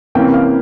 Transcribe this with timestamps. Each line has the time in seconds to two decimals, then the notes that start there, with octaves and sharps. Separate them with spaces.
0.15 C3 E3 A#3 C#4 G5
0.34 F5